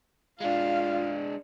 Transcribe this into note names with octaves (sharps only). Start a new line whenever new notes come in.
G#3 D4 F4 F5